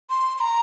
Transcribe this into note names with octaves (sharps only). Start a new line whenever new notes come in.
C6
C6
A#5